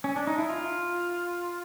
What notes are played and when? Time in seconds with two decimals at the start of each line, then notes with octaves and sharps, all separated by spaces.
0.04 C#4
0.16 D4
0.27 D#4
0.38 E4
0.49 F4